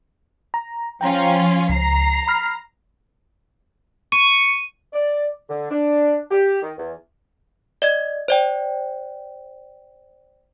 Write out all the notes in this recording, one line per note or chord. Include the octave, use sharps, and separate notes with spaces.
A#5
F3 C#4 F4 G5 A#5
C#2 A#5 C7
B5 F6
C#6 D#7
D5
D3
D4
G4
D#3
E2
D5 D#5 G#6
C5 D5 G5